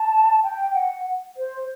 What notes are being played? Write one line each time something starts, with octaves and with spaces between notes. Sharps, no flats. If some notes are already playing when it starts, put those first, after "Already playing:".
Already playing: A5
G5
F#5
C5